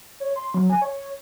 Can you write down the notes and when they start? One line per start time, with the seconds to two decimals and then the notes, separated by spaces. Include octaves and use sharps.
0.20 C#5
0.36 C6
0.54 F#3
0.70 G#5
0.82 C#5